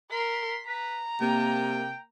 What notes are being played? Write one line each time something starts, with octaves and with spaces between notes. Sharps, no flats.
A#4 C6 B6
B4 A#5
C3 A#3 G5